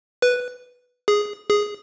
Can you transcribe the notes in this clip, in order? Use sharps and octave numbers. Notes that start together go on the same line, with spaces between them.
B4
G#4
G#4